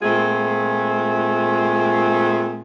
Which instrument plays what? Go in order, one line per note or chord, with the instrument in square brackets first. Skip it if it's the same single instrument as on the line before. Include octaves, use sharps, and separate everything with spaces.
[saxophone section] A#2 G#3 A3 C4 F4 G#4